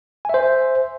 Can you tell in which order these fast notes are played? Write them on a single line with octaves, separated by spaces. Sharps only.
G#5 E5 C5